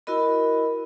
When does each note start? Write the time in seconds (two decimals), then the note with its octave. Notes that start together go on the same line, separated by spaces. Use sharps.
0.07 E4 F#4 A#4 D#5 B5